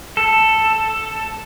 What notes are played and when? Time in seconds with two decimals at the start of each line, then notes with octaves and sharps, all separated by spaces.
0.17 A4